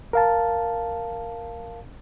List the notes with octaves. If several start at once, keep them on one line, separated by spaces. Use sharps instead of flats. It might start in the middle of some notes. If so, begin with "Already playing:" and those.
A#4 F5 A5